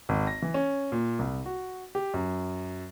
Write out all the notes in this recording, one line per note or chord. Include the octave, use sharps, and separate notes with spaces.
G#1
A#6
E3
C#4
A#2
C2
F#4
G4
F#2